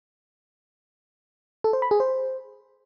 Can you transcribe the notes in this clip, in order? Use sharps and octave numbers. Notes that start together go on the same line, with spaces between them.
A4
C5
B5
G#4
C5